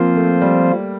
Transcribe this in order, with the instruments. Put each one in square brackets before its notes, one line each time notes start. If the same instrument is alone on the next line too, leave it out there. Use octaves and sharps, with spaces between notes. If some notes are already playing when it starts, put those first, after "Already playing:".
Already playing: [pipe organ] F3 C4 F4 C5 [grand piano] A#3
[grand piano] A3
G3